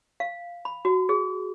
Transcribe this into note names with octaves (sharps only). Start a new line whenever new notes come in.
F5
B5
F#4
G#4